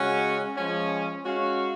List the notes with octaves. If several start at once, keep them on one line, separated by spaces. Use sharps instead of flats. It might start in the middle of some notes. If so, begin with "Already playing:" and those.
Already playing: C#3 G#3 C#4 F#4
F3 G#3 C#4
G#3 C#4 F#4 C#5 F5